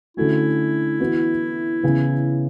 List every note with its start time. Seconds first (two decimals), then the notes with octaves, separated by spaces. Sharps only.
0.17 D3 A3 C#4 E4 F#4
1.00 E3 B3 F#4
1.83 C#3 E3 B3